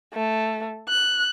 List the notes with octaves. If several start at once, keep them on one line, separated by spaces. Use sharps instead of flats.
A3
F#6